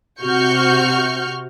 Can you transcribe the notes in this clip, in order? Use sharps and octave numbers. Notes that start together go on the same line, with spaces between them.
C3 F#4 C#6 F6 G6